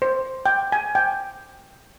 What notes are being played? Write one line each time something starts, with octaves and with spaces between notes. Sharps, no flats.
C5
G5
G#5
G5